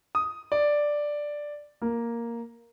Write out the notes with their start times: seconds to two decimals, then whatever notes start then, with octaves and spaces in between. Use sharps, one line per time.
0.15 D#6
0.52 D5
1.82 A#3